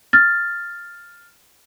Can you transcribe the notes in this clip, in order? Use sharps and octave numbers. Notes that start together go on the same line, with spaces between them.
F6 A6